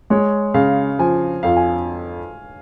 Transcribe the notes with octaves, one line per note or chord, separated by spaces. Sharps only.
G#3 C#5
C#3 F5
F3 G#5
F2 F5
G#5